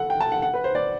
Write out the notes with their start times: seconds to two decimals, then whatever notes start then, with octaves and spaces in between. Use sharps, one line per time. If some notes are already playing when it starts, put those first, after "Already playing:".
Already playing: A4 F#5
0.10 G5
0.20 A5
0.32 F#5
0.42 F#5
0.54 B4
0.64 C5
0.75 D5